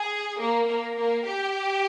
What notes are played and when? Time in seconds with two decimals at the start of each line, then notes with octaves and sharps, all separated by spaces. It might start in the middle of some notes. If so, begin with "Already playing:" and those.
Already playing: G#4
0.37 A#3
0.66 A#3
0.96 A#3
1.26 G4